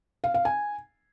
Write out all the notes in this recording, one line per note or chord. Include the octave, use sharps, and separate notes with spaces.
F5
F5
G#5